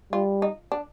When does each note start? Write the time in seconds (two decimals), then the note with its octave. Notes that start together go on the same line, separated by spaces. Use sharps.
0.13 G3 F4
0.42 D#4
0.72 D4